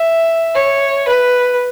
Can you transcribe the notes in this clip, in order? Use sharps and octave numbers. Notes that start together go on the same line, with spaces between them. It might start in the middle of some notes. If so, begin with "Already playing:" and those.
Already playing: E5
C#5
B4